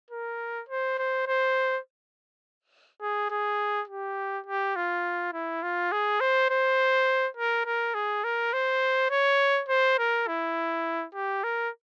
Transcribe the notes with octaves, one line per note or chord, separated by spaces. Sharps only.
A#4
C5
C5
C5
G#4
G#4
G4
G4
F4
E4
F4
G#4
C5
C5
A#4
A#4
G#4
A#4
C5
C#5
C5
A#4
E4
G4
A#4